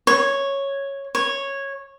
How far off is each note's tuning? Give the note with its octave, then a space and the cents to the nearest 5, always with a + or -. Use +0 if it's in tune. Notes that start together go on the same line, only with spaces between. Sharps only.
C#5 -5
C#5 -10